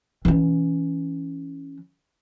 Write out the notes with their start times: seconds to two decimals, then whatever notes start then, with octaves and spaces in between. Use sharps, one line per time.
0.25 E3 C#4